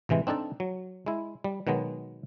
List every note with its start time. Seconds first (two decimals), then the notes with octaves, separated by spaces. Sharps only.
0.09 A1 C3 E3 G#3
0.27 C4 D4 D#4 A4 A5
0.60 F#3
1.06 G#3 E4
1.44 G3
1.67 B2 D#3 F#3 G#3 B3